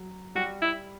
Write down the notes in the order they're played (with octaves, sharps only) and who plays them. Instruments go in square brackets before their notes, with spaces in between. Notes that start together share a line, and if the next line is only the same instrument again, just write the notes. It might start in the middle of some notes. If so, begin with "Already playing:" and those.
Already playing: [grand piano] F#3
[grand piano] G3 [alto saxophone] F#4
[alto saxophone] E4